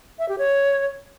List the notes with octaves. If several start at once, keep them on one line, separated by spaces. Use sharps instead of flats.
E5
G4
C#5